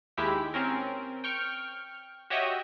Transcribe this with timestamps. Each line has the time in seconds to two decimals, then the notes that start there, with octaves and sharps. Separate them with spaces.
0.17 D#2 G#3 E4 G4 E5 B6
0.54 C4 C#4 A#4
1.24 G5 C#6 F6
2.30 F#4 G4 C#5 D#5 E5 D#6